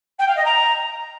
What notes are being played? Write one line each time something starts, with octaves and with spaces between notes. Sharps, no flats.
G5
F5
D#5
A#5